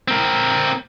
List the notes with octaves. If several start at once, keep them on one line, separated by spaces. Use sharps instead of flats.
C4 A#4